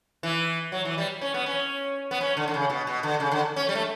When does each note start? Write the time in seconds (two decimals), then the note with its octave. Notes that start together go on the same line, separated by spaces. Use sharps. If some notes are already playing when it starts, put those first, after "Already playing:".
0.23 E3
0.72 F#3
0.85 E3
0.98 G3
1.21 C#4
1.34 B3
1.46 C#4
2.11 B3
2.21 C#4
2.37 D3
2.48 D3
2.54 C#3
2.70 B2
2.87 B2
3.03 D3
3.20 C#3
3.32 D3
3.56 C#4
3.69 G3
3.75 A3